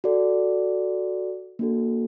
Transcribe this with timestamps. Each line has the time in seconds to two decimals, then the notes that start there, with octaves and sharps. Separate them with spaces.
0.04 F#4 A4 D5
1.59 A#3 D4 F#4 A4